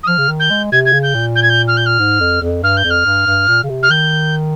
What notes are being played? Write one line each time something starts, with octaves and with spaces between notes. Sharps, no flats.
D#6
F3 F6
C#3
D#3
G6
G#3
C3 G#6
G#6
C#3
G6
A#2
G6
G#6
G6
F6
G6
F6
G#2
F2
F2
G2 F6
G6
F2
F6
G2
G2
A#2
C#3
C3
F6
D#3 G6